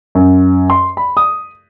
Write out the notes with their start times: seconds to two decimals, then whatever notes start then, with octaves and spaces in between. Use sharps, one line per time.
0.15 F#2
0.70 C6
0.97 B5
1.17 D#6